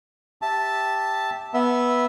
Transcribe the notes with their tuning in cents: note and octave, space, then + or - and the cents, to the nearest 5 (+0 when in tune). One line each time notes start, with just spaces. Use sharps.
G4 +0 E5 -10 A5 +0
B3 -10 E5 -10